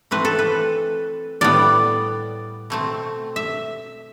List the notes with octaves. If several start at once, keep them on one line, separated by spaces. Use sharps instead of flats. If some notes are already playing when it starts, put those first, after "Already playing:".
E3 A3 C4 B4
A4
B4
A2 G3 B3 D5
B2 A3 C4
E5